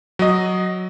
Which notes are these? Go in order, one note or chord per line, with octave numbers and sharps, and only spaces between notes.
F#3 D#5